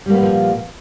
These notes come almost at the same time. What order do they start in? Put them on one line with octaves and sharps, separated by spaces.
G3 A#3 B3 A#2 F3